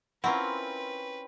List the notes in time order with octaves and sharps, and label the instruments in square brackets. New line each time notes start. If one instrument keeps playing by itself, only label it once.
[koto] C4 C#4 A#4 [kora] E4 F4 [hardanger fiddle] B4 [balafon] F#5